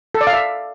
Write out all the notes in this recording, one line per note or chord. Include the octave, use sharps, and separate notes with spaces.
A4
D5
F5
E5